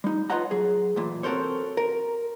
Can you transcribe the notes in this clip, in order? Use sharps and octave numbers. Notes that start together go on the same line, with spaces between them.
G3 D#4
F4 B4 C#5 D#5 F#5 A#5
F#3 G#4
B1 E2 A#2
C4 F#4 A4 A#4 C5 C#5
A#4